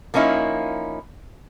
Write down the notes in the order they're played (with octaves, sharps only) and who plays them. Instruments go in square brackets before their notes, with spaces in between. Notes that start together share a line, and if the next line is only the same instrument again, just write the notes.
[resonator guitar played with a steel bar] F3 A#3 C#4 D#4 E4